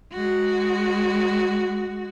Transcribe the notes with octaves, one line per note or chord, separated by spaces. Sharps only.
G#3 F#4